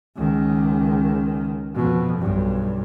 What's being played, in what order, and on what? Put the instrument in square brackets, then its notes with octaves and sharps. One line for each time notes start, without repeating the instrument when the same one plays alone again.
[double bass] C#2 D#3
F2 B2
B1 G2